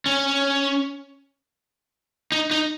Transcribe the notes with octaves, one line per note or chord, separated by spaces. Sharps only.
C#4
D#4
D#4